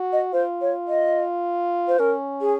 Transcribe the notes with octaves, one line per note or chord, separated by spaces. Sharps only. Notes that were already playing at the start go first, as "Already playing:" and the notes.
Already playing: F#4
D#5
F4 C5
C#5
D#5
C5
C#4 A#4
G#4